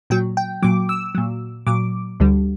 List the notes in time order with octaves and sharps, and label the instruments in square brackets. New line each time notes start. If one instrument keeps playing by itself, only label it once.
[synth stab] A#2 F#3 G5
G5
A#2 F#3 D6
E6
A#2 F#3
A#2 F#3 D6
D2 D3 G3